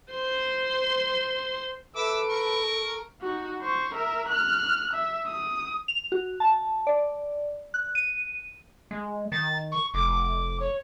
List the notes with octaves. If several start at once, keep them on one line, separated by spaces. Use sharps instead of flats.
C5 C6
A4 B4 E5 D6 E6 D7
A#4 C#6
D#4 F#4
C5 C#6
A#4 E5
F6 F#6
E5
D#6
F7
F#4
A5
D5
F#6
D#7
G#3
D#3 A6
C#6
F1 D6
C#5